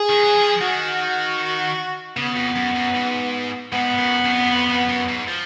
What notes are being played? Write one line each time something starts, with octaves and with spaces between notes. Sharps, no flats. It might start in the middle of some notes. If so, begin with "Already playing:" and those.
Already playing: G#4
D#3
F#3
F3
D#3 F#4
C#3 B3
F2
F#2
F#2
G#2
G#2 B3
F#2
F#2
F2
F#2
F2
F2
F#2
G#2
F3